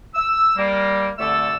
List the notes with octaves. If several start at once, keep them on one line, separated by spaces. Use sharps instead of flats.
E6
G3 A#3
C2 D3 A3 A4 D5 E6